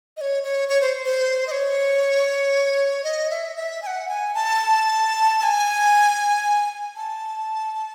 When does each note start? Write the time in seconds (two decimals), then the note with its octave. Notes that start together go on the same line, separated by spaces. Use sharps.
0.17 D#5
0.21 C#5
0.43 C#5
0.69 C#5
0.81 C5
1.05 C5
1.47 D#5
1.51 C#5
3.04 D#5
3.30 E5
3.56 E5
3.82 G#5
3.87 F#5
4.08 G#5
4.35 A5
5.39 A5
5.43 G#5
6.96 A5